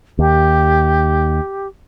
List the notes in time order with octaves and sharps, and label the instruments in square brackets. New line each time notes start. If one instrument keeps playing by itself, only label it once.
[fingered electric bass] D#2 [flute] G4